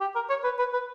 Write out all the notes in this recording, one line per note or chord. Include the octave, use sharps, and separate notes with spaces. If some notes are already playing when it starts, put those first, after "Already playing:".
G4
A#4
C#5
B4
B4
B4